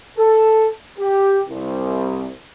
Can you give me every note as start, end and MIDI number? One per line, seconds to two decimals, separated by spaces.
0.18 0.68 69
0.99 1.40 67
1.47 2.31 36